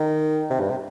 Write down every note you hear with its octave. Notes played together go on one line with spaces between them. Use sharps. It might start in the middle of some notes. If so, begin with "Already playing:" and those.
Already playing: D#3
C3
G2
C3